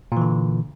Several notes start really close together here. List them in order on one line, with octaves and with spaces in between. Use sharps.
A#2 E3 D3